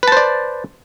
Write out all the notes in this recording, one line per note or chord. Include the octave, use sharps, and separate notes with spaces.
B4 C5 D5 A5